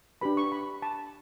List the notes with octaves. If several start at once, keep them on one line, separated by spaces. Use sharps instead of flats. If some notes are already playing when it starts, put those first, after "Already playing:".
D4 G4 B4 B5
C#6
B5
A5